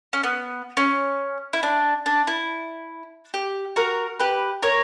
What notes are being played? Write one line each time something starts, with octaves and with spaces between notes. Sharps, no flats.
C#4
B3
C#4
E4
D4
D4
E4
G4
F#4 A#4
G4 B4
A#4 C#5